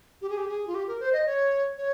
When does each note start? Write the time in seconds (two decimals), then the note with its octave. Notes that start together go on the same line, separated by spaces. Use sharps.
0.21 G4
0.29 G#4
0.37 G4
0.48 G#4
0.67 F4
0.75 G4
0.87 A#4
1.00 C5
1.13 D#5
1.26 C#5
1.77 C#5